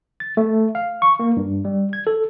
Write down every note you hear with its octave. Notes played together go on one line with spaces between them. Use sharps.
A6
A3
F5
C#6
A#3
G2
G3
G#6
A4